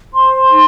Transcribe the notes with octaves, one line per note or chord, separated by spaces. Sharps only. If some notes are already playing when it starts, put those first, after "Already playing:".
C5 C6
D#4